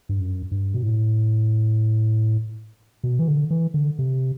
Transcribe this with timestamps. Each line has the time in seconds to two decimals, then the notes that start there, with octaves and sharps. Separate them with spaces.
0.09 G2
0.20 F#2
0.51 G2
0.74 B2
0.83 A2
3.04 B2
3.19 E3
3.28 D3
3.50 E3
3.74 D3
3.99 C3